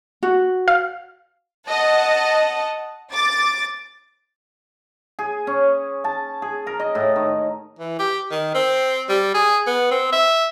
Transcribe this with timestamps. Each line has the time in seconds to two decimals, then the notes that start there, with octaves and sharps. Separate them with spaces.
0.23 F#4
0.68 F5
1.68 D#5 F#5 A5
3.14 D6 A6
5.19 G#4
5.47 C#4
6.04 A5
6.42 G#4
6.67 A#4
6.80 D#5
6.95 A2
7.16 D#3
7.79 E3
7.99 G4
8.31 D#3
8.54 C4
9.09 G3
9.34 G#4
9.67 B3
9.91 C4
10.12 E5